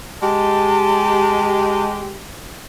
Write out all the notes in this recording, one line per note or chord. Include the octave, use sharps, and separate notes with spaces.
G#3 G4 A5